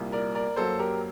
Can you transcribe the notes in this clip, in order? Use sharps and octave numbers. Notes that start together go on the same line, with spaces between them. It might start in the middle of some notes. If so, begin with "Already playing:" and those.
Already playing: C2 A#2 G3 A#3
A#4 D5
A#4 D5
F#2 F#3 A#3 A4 C5
G4 A#4